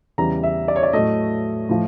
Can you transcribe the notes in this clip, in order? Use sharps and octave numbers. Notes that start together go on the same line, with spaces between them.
E2 C#3 E3 G3 A#5
E5
D5
C#5
D5
A2 F#3 A3 D#5
A2 F3